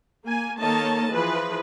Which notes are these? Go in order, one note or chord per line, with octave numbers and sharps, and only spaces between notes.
A#3 G#5
D#3 A#3 A4 C#5 D#5 A5
E3 F3 G#4 B4